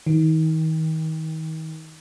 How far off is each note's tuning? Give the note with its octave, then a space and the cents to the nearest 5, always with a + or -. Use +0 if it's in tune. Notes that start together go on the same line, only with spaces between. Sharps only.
D#3 +35